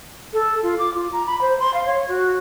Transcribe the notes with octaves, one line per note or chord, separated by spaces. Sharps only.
A4
F4
D6
F4
A#5
B5
C5
C6
F5
C#5
F#4